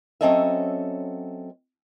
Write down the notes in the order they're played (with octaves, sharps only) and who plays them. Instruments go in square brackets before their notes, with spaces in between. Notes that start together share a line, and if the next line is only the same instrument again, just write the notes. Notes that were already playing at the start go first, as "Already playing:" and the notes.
[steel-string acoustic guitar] F#3 C4 C#4 A4 D#5 E5